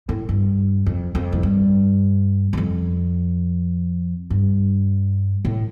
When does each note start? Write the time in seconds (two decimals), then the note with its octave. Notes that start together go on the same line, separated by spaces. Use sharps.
0.09 A2
0.29 G2
0.86 F2
1.15 F2
1.32 A2
1.43 G2
2.53 G2
2.57 F2
4.30 G2
5.45 A2